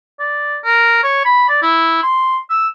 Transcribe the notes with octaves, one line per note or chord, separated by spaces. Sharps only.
D5
A#4
C#5
B5
D5
E4
C6
E6